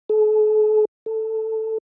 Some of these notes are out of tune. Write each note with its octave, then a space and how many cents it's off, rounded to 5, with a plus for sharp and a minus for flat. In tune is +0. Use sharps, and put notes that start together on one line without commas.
A4 -45
A4 +5